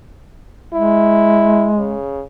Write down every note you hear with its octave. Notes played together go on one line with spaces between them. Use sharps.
G#3 E4
C#3